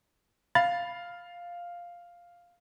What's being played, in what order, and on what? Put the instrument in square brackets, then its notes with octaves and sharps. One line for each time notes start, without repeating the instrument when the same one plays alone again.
[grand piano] F5 [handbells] B5 A6